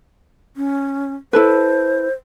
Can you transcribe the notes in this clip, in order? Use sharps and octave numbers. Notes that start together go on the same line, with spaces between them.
C#4
E4 A4 B4 C5